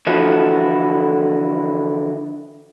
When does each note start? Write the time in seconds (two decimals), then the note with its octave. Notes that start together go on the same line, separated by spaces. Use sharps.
0.07 D3 E3 F3 E4 F#4 A4